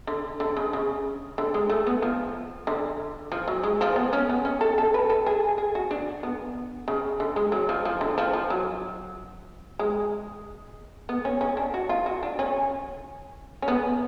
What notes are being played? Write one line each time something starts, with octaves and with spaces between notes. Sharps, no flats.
D3
D3
C#3
C#3
D3
G#3
A3
B3
F3
D3
F3
F#3
G#3
F3
B3
C#4
B3
C#4
A4
A4
B4
A4
G#4
G#4
F#4
D4
B3
C#3
D3
G#3
F#3
F3
F3
D3
F3
F3
F#3
G#3
B3
C#4
C#4
D4
F#4
F4
F#4
D4
C#4
C#4
B3